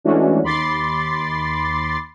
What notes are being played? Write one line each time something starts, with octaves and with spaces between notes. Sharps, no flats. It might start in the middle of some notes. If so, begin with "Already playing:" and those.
E3 G#3 A3 C#4 D4 F#4
D#2 B5 C6 D6 A6 C7